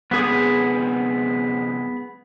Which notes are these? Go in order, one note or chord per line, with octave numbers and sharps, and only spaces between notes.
F#2 C3 G#3 B3 G#4 D#6